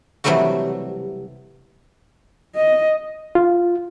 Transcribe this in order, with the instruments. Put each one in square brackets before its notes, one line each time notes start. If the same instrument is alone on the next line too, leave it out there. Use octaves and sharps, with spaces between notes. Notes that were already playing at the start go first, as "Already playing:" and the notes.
[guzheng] C3 E3 F#3 G3 A3 F#4
[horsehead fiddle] D#5
[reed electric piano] F4